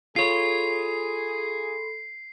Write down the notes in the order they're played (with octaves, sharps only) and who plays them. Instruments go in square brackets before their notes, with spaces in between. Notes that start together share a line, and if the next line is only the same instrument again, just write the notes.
[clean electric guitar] F4 C#5 [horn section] G#4 [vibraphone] A4 B5 C6 [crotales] C7